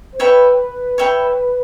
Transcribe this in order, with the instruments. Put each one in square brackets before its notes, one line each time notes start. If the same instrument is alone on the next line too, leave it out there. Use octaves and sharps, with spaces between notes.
[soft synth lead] C5
[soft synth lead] B4 [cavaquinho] C#5 E5 G5 B5
[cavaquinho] C#5 E5 G5 B5